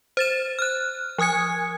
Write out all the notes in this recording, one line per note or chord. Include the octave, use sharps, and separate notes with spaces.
C5 A6 E7
F6 F#6
F3 G#5 D#6 G#6 C#7